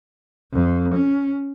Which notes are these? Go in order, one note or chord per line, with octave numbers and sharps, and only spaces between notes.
F2
C#4